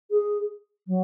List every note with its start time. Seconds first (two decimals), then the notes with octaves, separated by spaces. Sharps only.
0.11 G#4
0.87 F#3